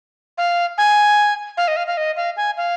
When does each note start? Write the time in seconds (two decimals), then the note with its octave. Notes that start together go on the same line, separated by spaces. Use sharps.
0.38 F5
0.78 G#5
1.57 F5
1.68 D#5
1.77 F5
1.87 F5
1.97 D#5
2.16 F5
2.37 G#5
2.57 F5